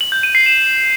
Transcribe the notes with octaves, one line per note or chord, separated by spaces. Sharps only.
F#7
G6
D#7
C7
E7